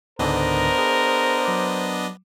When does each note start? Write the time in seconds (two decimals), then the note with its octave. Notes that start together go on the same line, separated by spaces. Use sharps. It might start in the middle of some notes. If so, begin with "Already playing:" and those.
0.19 C#2 G#2 D3 B3 D4 A#4 C5 D#5
0.78 G#4
1.45 F#3 D6